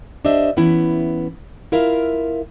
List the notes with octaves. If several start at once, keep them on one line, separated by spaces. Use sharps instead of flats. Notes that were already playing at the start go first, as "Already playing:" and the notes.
D4 G4 C5 D#5 E5
E3 B3 C#4 E4
E4 F4 A#4 E5 F5